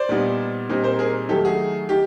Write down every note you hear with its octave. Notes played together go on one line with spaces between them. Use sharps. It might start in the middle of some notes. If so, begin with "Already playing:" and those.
Already playing: C5 D5
A#2 G3 B3 D#4
A#2 G3 C4 D#4
A#4 C5
G#4 A#4
D#3 F#3 A3 G4 A4
F#4 G#4
D#3 G4